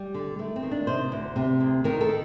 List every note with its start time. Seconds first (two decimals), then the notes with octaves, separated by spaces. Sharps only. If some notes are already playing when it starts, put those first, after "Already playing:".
Already playing: G3
0.14 D3
0.39 D#3 A3
0.56 C4
0.63 D#3
0.71 D4
0.87 C3 C5
1.12 D2
1.36 C3
1.60 D2
1.84 D#3 A#4
2.01 A4
2.09 D#3